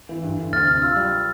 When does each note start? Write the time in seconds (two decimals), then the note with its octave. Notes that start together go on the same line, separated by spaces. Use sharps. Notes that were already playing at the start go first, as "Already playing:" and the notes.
0.09 E3
0.23 G2
0.38 D3
0.53 D2 F6 A6
0.67 C3 F6
0.77 F6
0.82 F4 E6
0.96 G3 F6